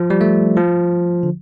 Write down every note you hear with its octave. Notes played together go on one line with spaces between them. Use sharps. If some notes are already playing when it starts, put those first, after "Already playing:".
Already playing: F3
G3
A3
F3
D3